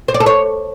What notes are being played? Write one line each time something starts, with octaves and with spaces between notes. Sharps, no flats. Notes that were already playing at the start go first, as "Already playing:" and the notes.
C5
D5
A4
C#5